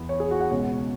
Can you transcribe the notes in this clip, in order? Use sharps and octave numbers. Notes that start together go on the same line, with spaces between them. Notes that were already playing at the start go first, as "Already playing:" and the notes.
Already playing: E2 E3 B3
C#5
G#4
F#4
F#5
C#2 B2 B3 C#5